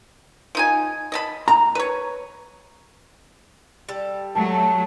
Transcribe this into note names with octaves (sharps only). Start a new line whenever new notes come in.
F3 D#4 G#5
D#5 A5 B5
A#5
B4 C#5
G3 A4
F#3 A3 A5